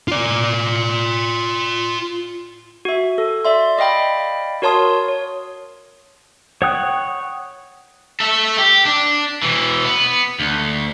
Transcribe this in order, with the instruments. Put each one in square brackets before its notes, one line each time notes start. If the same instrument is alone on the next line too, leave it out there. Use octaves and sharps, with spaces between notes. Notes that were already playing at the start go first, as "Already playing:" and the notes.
[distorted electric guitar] F4 D5
[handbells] F#4 E5
A4
D5 E5 C6
D5 D#5 F5 G5 B5
F#4 A#4 C#5 A5 C6 D#6
C#5
[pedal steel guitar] C#5 F#5 G5 D#6 F#6
[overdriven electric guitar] A4 E5
G4
D4
B2 E3
B3
D2